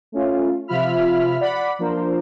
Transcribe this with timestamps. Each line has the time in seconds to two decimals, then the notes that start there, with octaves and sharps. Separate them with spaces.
0.12 A3 C#4 F4
0.68 C3 F3 F4 E5 B5 F6
1.41 D5 F#5 B5
1.79 F3 A#3 D4 A#4 C5